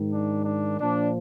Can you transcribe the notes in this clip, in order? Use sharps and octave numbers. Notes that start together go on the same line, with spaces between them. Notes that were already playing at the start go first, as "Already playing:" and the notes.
Already playing: G#2 D#3
D4
D4
A#2 F3 D4